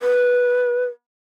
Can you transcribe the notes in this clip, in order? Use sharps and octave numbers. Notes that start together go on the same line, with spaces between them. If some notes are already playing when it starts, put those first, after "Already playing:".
B4